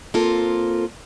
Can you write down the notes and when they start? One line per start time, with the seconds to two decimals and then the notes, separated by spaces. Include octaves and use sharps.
0.14 A#3 C4 F4 A4